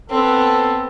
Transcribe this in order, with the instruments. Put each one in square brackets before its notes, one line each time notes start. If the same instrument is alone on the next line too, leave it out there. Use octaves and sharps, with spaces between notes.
[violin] B3 C4 [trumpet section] A4